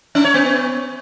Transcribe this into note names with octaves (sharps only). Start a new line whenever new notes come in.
C#4
C#5
B3